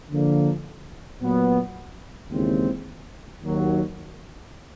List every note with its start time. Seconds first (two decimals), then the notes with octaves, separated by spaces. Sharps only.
0.11 D3 F3 A#3
1.22 A#2 F#3 B3
2.31 D#2 C#3 E3 G#3 C4
3.42 D#2 D#3 F#3